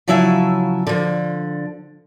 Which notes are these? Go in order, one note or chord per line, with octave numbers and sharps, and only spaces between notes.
C#3 F3 F#3 E4 E5 G#5
D3 F3